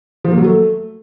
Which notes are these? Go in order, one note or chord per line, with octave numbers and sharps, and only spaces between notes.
F3
A#3
F#3
A3